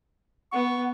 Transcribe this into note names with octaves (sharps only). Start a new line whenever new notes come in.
B3 F#5 C#6